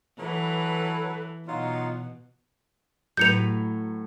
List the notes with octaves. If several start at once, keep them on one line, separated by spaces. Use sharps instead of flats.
E3 F#3 A4 B4
B2 F#3 D#4 F4
A2 F#3 E4 B4 G6 C#7 F7